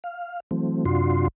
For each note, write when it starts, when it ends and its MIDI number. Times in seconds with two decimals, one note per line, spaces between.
0.04 0.40 77
0.51 0.85 52
0.51 0.85 54
0.51 0.85 57
0.51 0.85 60
0.85 1.28 42
0.85 1.28 48
0.85 1.28 62
0.85 1.28 65
0.85 1.28 66
0.85 1.28 84